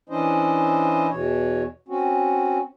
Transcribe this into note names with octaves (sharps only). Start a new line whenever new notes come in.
E3 C#4 D4 E4 C5 D#5
E2 B2 E3 C#5
C4 C#4 F#4